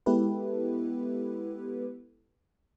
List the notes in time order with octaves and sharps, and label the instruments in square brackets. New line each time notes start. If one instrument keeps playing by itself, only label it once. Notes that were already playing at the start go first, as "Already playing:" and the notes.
[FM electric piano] G#3 B3 E4 G4 A4 B4